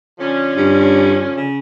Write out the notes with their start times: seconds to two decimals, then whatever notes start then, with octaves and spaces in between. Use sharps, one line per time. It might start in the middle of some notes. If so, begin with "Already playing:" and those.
0.19 D3 F3 C#4
0.57 G2
1.36 C#3